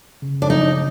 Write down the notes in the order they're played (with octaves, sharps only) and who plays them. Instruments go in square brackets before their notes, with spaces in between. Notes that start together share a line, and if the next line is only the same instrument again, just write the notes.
[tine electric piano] C#3
[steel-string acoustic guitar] D4
[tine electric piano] F#3 [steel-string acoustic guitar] D#4